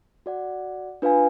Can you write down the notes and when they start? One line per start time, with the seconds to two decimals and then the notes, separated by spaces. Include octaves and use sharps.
0.26 F#4 D5 F#5
1.02 D4 F4 B4 F5 G#5